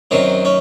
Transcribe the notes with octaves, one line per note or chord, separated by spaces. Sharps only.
F#2 D#3 F#3 C4
C#4